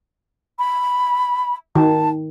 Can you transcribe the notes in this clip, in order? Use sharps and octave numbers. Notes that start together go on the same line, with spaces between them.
B5
D#3 A5